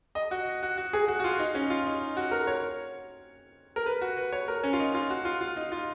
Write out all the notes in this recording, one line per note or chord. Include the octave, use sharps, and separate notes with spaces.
D#5
F#4
F#4
F#4
G#4
F#4
F#4
F4
D#4
C#4
F4
D#4
F#4
A#4
C#5
A#4
B4
F#4
B4
C#5
A#4
C#4
F4
D#4
F4
F#4
F4
F4
D#4
F4